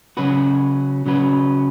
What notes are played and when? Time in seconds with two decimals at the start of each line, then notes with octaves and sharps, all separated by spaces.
0.17 C#3 F#3 C#4 F#4 B4
1.06 C#3 F#3 C#4 F#4 B4